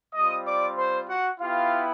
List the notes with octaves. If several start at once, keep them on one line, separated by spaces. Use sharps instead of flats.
G3 C4 F4 D#5 D#6
D5 D6
C5 C6
F#4 F#5
B3 E4 F4 G4 F5